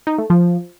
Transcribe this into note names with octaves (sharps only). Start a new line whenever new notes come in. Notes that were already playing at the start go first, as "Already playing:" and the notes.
D#4
A3
F3